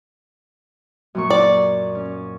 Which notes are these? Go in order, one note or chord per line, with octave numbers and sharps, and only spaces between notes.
F#2 A#2 C#6
D5
C#4